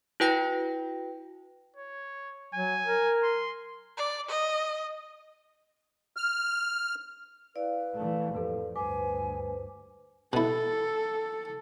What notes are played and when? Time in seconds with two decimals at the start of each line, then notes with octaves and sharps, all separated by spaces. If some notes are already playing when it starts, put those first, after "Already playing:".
0.20 E4 F#4 B4 G5 A#6
1.77 C#5
2.54 F#3 G#5
2.85 A#4
3.23 C6
3.97 D5
4.29 D#5
6.17 F6
7.56 E4 B4 D5 F5
7.95 E3 A3
8.35 F2 A2 G4 A4 B4
8.76 D2 G2 B4 C5 G#5 D6
10.33 B2 E4 A4